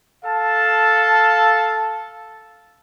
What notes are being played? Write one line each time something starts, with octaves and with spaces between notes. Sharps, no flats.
A4 F5 A5